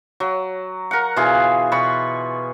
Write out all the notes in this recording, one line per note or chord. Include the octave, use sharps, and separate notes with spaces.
F#3
A#4 F#5
B2 E3 F4 G#4
B2 B5 C#6